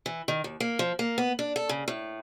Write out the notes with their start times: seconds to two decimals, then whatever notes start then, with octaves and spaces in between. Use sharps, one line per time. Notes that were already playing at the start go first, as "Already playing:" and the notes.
0.06 E3
0.28 D#3
0.44 D#2
0.60 A#3
0.79 F3
0.99 A#3
1.18 B3
1.39 D4
1.56 A4
1.69 C#3
1.88 A2